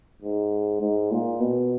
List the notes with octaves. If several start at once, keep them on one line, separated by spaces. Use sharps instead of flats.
G#2
G#2
A#2
B2